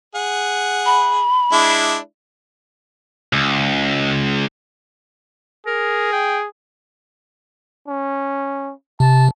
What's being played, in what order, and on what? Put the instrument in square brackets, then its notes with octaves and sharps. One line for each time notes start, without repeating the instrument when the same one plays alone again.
[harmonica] G#4 F#5
[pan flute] B5
[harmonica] G#3 D4 E4
[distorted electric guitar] C#2
[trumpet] G#4 [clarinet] A#4
[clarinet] G5
[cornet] C#4
[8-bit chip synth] C3 [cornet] A5